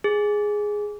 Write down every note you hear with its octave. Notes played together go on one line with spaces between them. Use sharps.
G#4